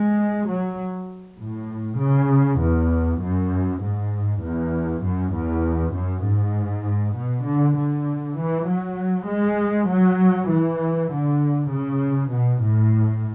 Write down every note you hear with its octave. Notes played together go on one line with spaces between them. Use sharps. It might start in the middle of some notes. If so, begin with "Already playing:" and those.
Already playing: G#3
F#3
A2
C#3
E2
F#2
G#2
E2
F#2
E2
F#2
G#2
B2
D3
D3
E3
F#3
G#3
F#3
E3
D3
C#3
B2
A2